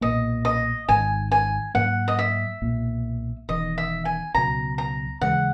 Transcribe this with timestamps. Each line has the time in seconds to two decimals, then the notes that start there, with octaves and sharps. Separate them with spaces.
0.01 B1 A#2 A#3 D#5
0.45 D#5
0.89 G#1 G#2 D#3 G#5
1.32 G#5
1.74 G#2 F#3 A#3 F#5
2.08 D#5
2.19 E5
2.62 B1 A#2 A#3
3.49 E1 E2 D#3 D#5
3.78 E5
4.05 G#5
4.35 C#2 B2 F#3 A#5
4.78 A#5
5.21 D#2 C#3 E3 G#3 F#5